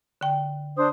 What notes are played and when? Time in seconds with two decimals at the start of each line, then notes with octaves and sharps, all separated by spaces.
0.21 D3 G5
0.77 D4 C5 D#6